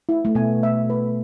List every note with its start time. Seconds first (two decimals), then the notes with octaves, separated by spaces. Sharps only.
0.09 E4
0.25 A3
0.35 B2 B3 G#5
0.63 E5
0.90 B4